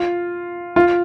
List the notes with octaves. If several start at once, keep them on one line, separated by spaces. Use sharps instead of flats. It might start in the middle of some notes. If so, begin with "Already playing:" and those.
Already playing: F4
F4